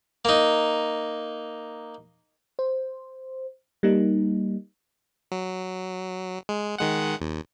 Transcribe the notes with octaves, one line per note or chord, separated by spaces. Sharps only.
A#3 D#4
C5
G3 A#3 D#4
F#3
G#3
D#3 G#3 F#5
D#2